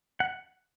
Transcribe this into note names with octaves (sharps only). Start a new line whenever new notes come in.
F#5